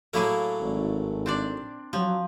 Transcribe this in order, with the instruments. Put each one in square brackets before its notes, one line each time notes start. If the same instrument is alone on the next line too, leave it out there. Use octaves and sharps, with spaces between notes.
[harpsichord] A2 F#3 A3 [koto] A#3 E4 G#4
[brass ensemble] G#1
[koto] C4 D4 D5
[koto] F3 [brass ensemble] F#3